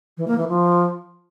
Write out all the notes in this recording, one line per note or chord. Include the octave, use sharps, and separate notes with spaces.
E3
A#3
E3
F3